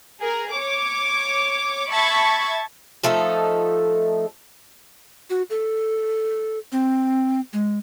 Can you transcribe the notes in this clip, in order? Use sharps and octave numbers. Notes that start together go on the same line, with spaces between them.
G#4 A#4
C#5 D6
E5 A5 B5 C#6 G#6
F3 A3 D#4 A4
F#4
A4
C4
G#3